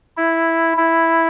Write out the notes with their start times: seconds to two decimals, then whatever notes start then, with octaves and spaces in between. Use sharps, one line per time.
0.17 E4
0.77 E4